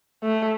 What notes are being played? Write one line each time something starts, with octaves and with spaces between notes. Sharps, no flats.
A3